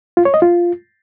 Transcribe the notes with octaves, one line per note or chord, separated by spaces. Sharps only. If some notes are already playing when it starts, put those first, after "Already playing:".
F4
C#5
D#5
F4